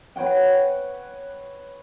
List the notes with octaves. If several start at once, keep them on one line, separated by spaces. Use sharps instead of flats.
B4 C#5 F#5 G5